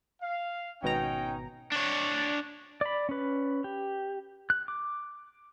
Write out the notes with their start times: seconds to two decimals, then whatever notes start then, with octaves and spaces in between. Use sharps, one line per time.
0.22 F5
0.83 G#1 B2 C#4 D#4 G5 A#5
1.72 D4 C#5
2.81 D5 B5
3.09 C#4 B4
3.64 G4
4.50 F#6
4.68 D6